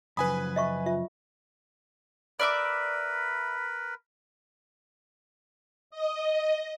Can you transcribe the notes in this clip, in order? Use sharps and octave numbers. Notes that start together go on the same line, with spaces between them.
F#2 C#3 F3 B4 G#5 B5 D#6
D#5 E5 C#6
F4 E5
A#4 B4 D5 E5 B5 D6
D#5